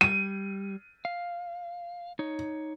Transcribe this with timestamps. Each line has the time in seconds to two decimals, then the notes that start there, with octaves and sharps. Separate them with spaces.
0.01 G3 D#7
1.05 F5
2.19 D#4 C#5